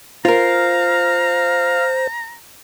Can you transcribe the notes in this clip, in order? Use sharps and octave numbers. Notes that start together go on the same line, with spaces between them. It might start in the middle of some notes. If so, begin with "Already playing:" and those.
F4 A#4 C5 F5 A#5